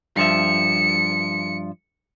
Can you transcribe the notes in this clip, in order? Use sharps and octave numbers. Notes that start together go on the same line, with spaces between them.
G2 F3 E5 C#7